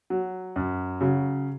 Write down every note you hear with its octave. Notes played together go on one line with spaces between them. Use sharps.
F#3
F#2
C#3 F#3